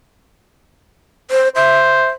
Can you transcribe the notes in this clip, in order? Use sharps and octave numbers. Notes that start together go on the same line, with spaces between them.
C5
C5 E5